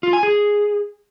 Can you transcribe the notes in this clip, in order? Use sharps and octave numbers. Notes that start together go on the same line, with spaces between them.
F4
G#5
G#4